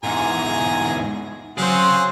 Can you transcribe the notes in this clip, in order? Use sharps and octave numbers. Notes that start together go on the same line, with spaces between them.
E2 G#2 G#4 G#5 A#5
F#3 C4 C#4 G#4 C5 F5 F#5